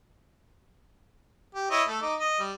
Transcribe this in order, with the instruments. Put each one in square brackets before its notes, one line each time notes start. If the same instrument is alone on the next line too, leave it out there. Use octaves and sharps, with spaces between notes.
[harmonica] G4
E4 C#5 D#5
A3 A4
D#4 D6
D#5
G3